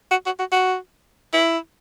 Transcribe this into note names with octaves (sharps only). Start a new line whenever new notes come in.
F#4
F#4
F#4
F#4
E4